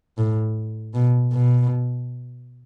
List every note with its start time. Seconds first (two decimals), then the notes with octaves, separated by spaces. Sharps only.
0.18 A2
0.94 B2
1.33 B2